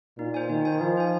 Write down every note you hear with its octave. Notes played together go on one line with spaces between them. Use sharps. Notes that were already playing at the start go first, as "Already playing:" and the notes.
A#2 D#4
C5 G#5
D#3 D#4
C5 G#5
F3 D#4
C5 G#5